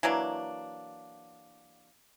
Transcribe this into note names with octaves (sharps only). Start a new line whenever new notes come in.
E3 F#3 A#3 D4